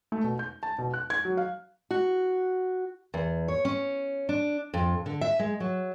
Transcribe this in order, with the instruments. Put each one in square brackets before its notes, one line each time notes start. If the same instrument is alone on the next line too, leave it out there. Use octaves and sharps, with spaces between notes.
[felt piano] A3
B2
G6
A5
B2
F#6
G#6
F#3
F5
[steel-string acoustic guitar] F#4
E2
C#5
C#4
D4
F2
D3
E5
G#3
F#3